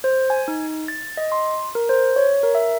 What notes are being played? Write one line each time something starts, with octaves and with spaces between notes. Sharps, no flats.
C5
G#5
D#4
A6
D#5
C6
A#4
C5
C#5
A#4
E5